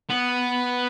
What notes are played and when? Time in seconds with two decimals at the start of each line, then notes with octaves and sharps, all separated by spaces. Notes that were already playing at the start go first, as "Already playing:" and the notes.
0.10 B3